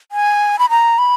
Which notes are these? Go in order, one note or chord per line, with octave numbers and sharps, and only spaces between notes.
G#5
B5
A#5
B5